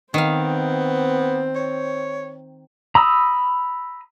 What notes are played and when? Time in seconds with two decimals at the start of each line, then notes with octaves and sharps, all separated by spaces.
0.14 D#3 B3 C4 C5 F5
1.55 C#5
2.95 A#5 B5 D#6 E6